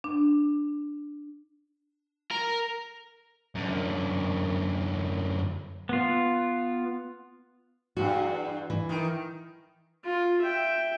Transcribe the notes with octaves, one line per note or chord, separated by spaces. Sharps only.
D4
A#4
F#2 D3
B3 F4
E2 G2 F#4
E3
D#3
F4
E5 G5